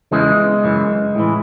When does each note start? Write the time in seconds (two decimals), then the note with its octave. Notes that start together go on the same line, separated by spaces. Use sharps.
0.12 E2 C#3 E3 G#3
0.64 F#2 C#3 E3
1.15 A2 E3